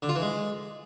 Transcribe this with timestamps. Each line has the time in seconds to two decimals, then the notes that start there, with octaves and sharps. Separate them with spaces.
0.02 D3
0.09 F4
0.15 E3
0.22 G#3